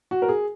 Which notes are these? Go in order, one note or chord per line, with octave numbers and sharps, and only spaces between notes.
F#4
A#4
G#4